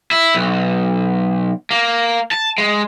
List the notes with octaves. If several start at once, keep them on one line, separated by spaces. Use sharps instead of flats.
E4
B1
A#3
A5
G#3